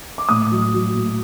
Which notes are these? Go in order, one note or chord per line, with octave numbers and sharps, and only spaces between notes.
D6
A2 D#6
F#3
F#3
A2